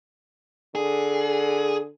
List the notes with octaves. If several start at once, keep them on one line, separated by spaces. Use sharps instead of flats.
D3 G#4